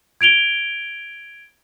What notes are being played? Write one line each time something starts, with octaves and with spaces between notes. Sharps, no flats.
G#6 D7 F7 G7